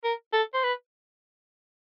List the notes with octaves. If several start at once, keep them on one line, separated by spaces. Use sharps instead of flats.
A#4
A4
C5
B4